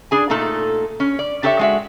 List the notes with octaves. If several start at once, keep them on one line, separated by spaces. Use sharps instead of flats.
D4 G#4 G#5
A#2 A3 D#4 A4
C#4
D5
D4 G4 A4 C#5 D#5 E5
G#3 F#4 E5